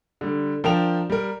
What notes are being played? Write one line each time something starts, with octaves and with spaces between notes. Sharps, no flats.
D3 G3
F3 D4 A#4 G5 A5 F7
G3 A#4